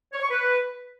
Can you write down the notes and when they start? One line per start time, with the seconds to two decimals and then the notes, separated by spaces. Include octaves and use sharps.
0.13 C#5
0.21 C#6
0.30 B4